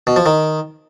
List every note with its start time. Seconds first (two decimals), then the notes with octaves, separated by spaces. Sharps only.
0.07 B2
0.16 F3
0.26 D#3